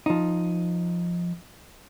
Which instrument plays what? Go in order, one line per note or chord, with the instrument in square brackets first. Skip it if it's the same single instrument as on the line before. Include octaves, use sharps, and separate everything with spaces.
[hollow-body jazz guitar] F3 D#4